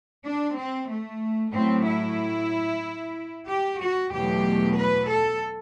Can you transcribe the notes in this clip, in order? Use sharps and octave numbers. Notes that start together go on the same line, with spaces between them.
D4
C4
A3
A2 F#3 A3 C4
E4
G4
F#4
E2 B2 F#3 A3 G4
B4
A4